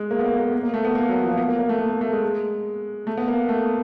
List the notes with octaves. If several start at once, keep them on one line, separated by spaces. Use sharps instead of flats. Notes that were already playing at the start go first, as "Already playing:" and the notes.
Already playing: G#3
A#3
B3
A#3
A#3
A#3
A#3
A3
B3
A#3
F#3
F3
A#3
B3
A#3
A#3
A3
A#3
A#3
A3
G#3
A3
B3
A#3
A3